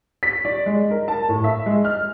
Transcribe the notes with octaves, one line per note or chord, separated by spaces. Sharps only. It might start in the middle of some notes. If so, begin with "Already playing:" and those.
B6
D5
G#3
A#4
A5
A2
E5
G#3
F6